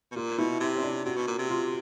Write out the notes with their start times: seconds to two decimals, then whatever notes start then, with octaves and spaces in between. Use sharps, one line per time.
0.11 B2
0.16 A#2 F4
0.38 B2 E4
0.60 C3
0.76 C#4
0.83 D4
1.05 C3 F#4
1.16 B2
1.28 A#2
1.39 C3
1.50 F4